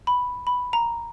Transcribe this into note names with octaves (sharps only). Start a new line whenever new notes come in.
B5
B5
A#5